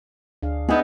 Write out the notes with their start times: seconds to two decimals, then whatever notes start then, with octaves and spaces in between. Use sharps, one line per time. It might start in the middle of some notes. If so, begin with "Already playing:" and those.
0.43 D2 D4 G#4 F5
0.69 B3 D4 D#4 G#4 D#5 E5